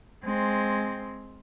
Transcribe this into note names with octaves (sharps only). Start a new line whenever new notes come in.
G#3 C4